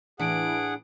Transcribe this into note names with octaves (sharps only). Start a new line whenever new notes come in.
A2 E3 D4 G#4 F#5 D7